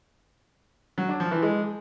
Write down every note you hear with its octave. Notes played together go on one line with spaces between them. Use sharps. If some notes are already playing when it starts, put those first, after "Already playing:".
F#3
D4
F3
E3
G#3